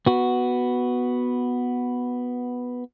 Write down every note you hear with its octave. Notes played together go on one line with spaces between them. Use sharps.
B3 F#4